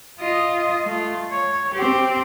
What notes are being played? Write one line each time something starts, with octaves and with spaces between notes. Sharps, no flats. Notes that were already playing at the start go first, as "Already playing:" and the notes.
F4 D#5
A3 F4
C#5
C4 G4